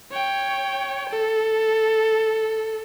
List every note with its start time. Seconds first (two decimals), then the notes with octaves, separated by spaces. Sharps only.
0.12 C#5 G5
1.09 A4